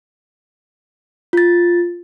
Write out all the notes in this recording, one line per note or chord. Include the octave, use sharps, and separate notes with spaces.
F4 A6